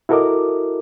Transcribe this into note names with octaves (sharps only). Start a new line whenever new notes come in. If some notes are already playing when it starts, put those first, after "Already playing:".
E4 F#4 A4 A#4 D#5 D6